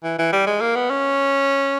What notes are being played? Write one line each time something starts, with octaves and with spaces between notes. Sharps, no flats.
E3
E3
G3
G#3
A#3
B3
C#4